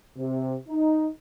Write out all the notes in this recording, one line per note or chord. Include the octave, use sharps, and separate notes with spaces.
C3
D#4